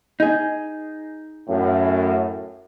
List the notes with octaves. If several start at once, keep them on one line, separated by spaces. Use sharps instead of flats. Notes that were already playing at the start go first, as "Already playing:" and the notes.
D#4 G#4
F#2 A2